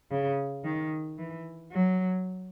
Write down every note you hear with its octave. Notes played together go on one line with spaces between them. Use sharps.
C#3
D#3
E3
F#3